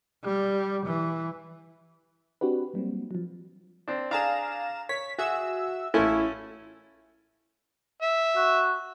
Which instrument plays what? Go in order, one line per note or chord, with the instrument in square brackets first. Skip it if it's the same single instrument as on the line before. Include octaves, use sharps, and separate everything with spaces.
[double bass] G3
E3
[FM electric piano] C4 D4 F#4 G4 B4
F#3 G3 A#3 C4
F3 F#3
[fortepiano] C4 D4
[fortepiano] D4 G#4 [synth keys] F5 A#5 E7
[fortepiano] C#5 [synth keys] B6
[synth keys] F#4 E5 E6 [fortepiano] G#4
[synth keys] A1 E4 [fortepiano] A3 C#4 F4
[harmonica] E5
[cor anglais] F#4